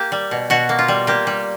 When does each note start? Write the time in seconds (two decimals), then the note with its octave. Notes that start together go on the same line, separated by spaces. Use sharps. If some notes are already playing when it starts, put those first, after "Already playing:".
Already playing: A#3 G4
0.12 G3
0.31 B2
0.50 B2 F#4
0.69 A#3
0.79 F4
0.88 G3
1.07 A#3 G4
1.27 G3